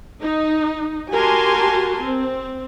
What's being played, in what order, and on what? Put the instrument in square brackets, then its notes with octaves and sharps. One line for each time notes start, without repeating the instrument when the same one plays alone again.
[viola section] D#4
F#4 G4 A#4 G#5 A5 C6
C4